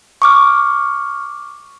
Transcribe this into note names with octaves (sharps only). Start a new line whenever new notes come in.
C#6 D6 F6